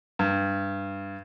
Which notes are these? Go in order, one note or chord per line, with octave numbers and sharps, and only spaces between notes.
G2